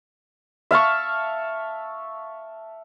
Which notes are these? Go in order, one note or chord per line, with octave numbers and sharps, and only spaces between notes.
E5 F5 A5 C#6